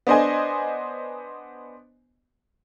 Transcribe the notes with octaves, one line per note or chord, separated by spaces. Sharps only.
B3 D4 C5 D#5 G#5